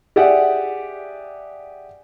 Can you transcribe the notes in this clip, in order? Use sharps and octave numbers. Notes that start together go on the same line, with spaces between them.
G4 G#4 D5 E5 F#5